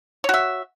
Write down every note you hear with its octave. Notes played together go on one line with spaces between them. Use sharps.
F#4 C#5 E5